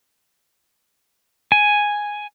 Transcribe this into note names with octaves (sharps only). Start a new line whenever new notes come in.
G#5